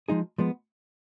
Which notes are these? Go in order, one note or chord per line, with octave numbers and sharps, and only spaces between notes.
F3 G#3 D#4 G#4
F3 G#3 B3